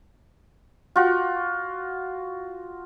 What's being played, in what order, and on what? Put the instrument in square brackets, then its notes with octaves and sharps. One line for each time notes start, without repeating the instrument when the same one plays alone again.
[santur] F4 F#4